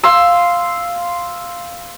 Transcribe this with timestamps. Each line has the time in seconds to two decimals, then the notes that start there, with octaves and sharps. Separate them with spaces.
0.03 F5 C6 E6